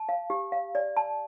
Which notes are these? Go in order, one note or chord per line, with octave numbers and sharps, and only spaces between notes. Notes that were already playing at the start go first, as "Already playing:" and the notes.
Already playing: A5
F5
G4
F5
D5
A5